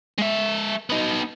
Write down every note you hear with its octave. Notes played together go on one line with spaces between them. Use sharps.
G#3 E5
B3 D#4